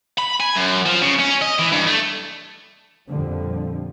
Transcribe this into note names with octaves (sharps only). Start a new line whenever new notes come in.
B5
G#5
F#2
F3
C#3
C#4
D#5
E3
G2
A3
F2 A#2 D3 F3 G3